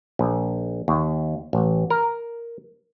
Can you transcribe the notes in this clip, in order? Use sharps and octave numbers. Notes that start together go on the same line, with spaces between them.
A#1
D#2
A1
A#4